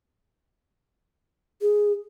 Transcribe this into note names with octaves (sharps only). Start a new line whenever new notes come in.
G#4